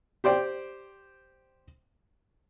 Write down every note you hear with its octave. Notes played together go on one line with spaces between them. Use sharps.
G4 C5 D5 G5